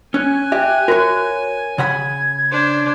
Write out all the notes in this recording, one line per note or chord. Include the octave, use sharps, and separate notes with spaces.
C#4 G#5 F#6
G4 E5
F#4 A#4 C#5
C#3 F#5 B5 G#6
D4 C5